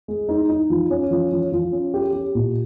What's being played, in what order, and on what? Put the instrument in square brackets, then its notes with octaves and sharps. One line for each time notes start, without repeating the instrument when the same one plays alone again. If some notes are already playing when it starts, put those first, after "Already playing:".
[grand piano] G#3
D#4
D#4
F3
C#4
F3
F3
F3
C#4
G4
G4
A#2